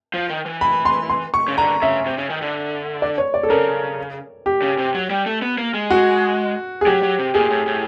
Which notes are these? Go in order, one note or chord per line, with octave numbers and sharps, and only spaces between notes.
F3
D#3
E3
B5
C6
C6
C#6
C#3
D3 A#5
C#3 E5
C3
C#3
D#3
D3
D5
C#5
D5
A4
C#3 A#4
G4
C#3
C3
F#3
G3
A3
B3
A#3
G#3
F#4
G#4
F#3 G4
F#3
C3
A#2 G#4
A2
A2